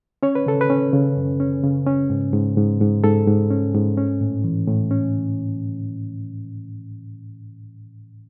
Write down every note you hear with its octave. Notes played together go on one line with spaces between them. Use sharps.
C#4 C#5
B4
C#3 A4
B4
C#4
C#3
F#2
C#4
C#3
C#4
G#2
G#2
G#2
G#2
G#2 A4
G#2
C#4
G#2
C#4
A2
E3
A2
C#4